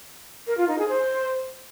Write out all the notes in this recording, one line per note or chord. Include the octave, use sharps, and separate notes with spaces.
A#4
F4
D#4
G#4
C5